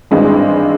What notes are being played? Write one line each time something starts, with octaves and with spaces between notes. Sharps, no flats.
G#1 G2 E3 G#3 C4